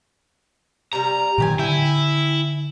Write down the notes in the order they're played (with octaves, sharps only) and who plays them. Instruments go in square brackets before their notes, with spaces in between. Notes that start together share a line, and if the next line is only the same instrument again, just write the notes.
[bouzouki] C3 G3 A#4 [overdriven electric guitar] A#5
[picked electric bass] A#2 D#3 F#3 [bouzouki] C4 G4 G#5
[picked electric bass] D3 [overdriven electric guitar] E4 [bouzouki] G5 G#5